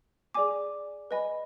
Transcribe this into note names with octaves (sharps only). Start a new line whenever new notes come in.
G#4 D5 G#5 D6
B4 D#5 G#5 B5